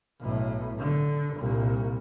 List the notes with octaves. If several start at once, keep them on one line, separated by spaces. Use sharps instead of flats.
B1 A2
D3
C2 A#2